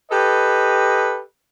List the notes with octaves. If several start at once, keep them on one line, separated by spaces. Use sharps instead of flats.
G4 A4 B4 D#5